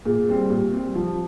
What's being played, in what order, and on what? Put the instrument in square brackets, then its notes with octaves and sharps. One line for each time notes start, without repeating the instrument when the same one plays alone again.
[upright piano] A#2 [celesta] G#4
[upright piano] G3 C4
[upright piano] A#2 [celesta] G4
[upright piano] G3 C4
F3